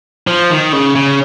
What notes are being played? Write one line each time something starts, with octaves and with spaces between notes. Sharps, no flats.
F3
D#3
C#3
C#3